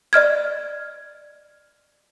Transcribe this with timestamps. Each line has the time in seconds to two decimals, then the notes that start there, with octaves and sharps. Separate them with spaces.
0.13 D5 D#5 F6 G#6